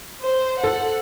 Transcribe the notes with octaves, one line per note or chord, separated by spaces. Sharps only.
C5
A4 F#5